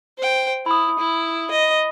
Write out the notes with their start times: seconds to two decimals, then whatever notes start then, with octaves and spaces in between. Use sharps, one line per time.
0.18 C5 G5
0.66 E4 B5 D#6
0.99 E4
1.51 D#5